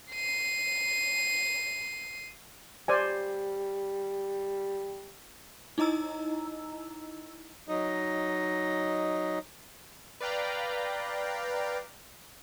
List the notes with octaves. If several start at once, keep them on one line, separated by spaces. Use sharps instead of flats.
C7 D#7
G3 C5 D5 G#5
D#4 E4 D#5 A#5 E6
F#3 D#4 D#5
B4 D5 F5 G5 A#5